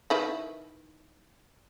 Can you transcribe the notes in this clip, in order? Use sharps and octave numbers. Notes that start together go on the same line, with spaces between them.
D#3 E4 B4